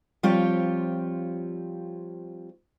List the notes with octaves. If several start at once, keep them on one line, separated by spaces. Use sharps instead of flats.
F3 G3 C4 F4 G4 C#5